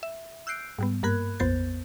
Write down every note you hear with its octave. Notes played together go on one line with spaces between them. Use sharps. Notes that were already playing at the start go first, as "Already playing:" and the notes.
E5
E6 F#6 G6 C7 D7
G#2 G3 B3
G2 A#3 A#4 B5 F#6 G#6
A#1 F2 B3 C5 G6 A6